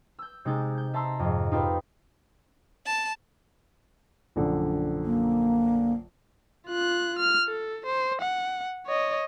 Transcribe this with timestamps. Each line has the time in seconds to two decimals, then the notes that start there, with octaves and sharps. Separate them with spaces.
0.19 E6 G6
0.45 C3 G#3 D#4 G6 A6
0.77 G6
0.94 E5 A5 A#5 C6 E6
1.19 F2 G#2
1.52 D#4 F4 G4 A4 B4
2.86 A5
4.36 A#1 F#2 D3
5.04 A#3
6.68 F4 F#6
7.19 F6
7.48 A4
7.86 C5
8.21 F#5
8.86 C#5 D#5